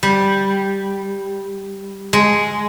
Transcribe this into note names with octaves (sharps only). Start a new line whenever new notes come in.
G3
G#3